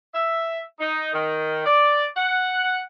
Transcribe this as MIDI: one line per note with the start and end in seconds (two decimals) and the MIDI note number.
0.14 0.60 76
0.79 1.09 63
1.13 1.66 51
1.66 2.06 74
2.17 2.80 78